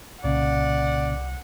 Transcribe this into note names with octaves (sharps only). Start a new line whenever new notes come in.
C2 A#2 C#3 D5 F#5